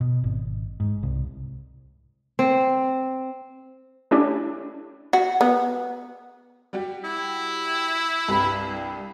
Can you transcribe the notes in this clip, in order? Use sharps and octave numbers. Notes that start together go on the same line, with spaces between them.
B2
G#1
G#2
C2
C4
A3 C#4 D4 E4 G4 D5
F#4
B3
G3 F#4 G4
E4
C2 G2 G4 B4 B5